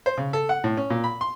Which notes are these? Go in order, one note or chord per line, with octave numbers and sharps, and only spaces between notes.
C5
C#3
A4
F#5
A2
C#4
A#2
B5
C6